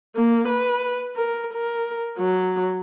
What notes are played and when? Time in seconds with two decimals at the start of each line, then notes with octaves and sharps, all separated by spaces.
0.16 A#3
0.48 B4
1.16 A#4
1.53 A#4
2.18 F#3